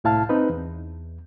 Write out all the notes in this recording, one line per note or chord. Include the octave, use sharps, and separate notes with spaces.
C2 A2 E4 F5 A5 F6
C4 D#4 B4
E2